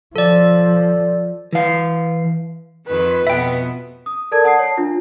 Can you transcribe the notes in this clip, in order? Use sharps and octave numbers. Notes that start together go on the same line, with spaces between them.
F3 A4 D5
E3 F5
F2 D#3 B4
F2 B2 B3 E5 G5
D#6
A4 A#4 D5 A5 G#6
F#5 A5 D#6 C7
C#5 A5
D4 F4